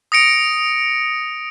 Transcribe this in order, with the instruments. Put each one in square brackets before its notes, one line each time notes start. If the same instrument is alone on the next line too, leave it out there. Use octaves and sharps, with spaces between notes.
[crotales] D#6 A#6 C#7 D7